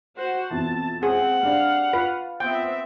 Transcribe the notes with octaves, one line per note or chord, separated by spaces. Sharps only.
F#4 C5 F#5
F2 B2 E3 A5
C4 G#4 F#5
G3 D4 F5
F4 B4
B3 C4 E5 G5